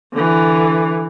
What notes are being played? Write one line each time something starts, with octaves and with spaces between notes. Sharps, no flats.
D3 E3